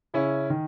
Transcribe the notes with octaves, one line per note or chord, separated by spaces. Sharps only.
C#3 C#4 E4
D#3